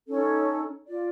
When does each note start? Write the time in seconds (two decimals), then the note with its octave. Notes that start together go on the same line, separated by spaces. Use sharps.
0.08 C#4 D#4 A4
0.88 F4 D5